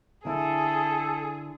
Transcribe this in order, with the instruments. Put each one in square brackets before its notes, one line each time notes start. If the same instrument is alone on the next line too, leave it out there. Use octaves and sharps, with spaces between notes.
[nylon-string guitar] D3 E4 [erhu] G#4 [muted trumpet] A4